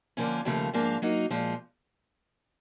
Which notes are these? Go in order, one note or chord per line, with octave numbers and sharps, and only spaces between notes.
D3 F3 A#3 C#4
D#2 C#3 F3 A3
G#2 F3 A#3 D4
F#3 A#3 D#4
A#2 F3 G#3